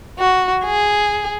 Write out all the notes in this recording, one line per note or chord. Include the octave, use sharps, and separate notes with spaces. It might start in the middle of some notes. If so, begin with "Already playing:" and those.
F#4
G#4